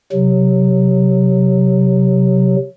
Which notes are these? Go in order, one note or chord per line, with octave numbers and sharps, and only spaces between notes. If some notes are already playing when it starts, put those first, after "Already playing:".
C3 F#3